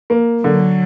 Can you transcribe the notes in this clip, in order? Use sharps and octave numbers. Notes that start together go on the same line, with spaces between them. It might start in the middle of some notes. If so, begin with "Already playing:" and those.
A#3
D3 F#3